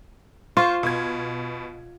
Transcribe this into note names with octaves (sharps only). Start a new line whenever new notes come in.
F4 C5 C#6 F6
B2 G#6